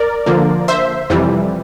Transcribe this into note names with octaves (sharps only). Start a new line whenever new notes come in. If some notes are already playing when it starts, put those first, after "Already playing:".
Already playing: A#4 D5
D3 F3 A#3
C5 E5
F2 C3 E3 G3